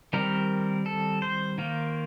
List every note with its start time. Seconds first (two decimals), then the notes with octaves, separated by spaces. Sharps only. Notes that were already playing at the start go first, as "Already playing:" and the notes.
0.13 D#3 G3 C4 A#4
0.86 A4
1.22 C5
1.58 D#3 A#3